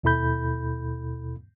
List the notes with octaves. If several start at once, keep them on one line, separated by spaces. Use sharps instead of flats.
D#2 B2 E4 A4 B5 G6